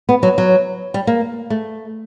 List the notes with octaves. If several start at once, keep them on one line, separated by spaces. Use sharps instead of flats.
B3
F#3
F#3
G3
A#3
A3